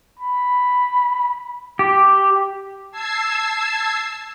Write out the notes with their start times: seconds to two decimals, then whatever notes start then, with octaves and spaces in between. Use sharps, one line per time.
0.19 B5
1.79 G4
2.91 A5 E6 G#6 C7